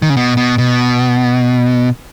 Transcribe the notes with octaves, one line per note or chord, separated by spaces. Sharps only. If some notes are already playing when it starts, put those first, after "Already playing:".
D#3
C#3
B2
B2
B2